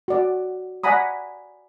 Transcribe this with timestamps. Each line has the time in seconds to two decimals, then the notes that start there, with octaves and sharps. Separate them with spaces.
0.08 F#4 D5
0.84 D5 F#5 G#5 A#5 B5 D#6